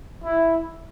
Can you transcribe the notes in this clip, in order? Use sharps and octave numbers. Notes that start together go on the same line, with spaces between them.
E4